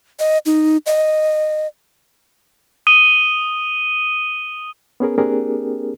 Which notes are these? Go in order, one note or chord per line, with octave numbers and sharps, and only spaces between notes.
D#5
D#4
D#5
D#6 D#7 G7
B3 C#4 G#4 A#4
A#3 C4 D4 G4 G#4 A#4